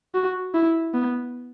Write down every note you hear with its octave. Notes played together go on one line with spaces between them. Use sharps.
F#4
E4
B3